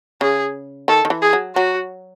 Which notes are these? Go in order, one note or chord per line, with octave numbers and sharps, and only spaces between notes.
C#3 G#4
D#3 A4
D#3
E3
G#4
F#3
F#3 F#4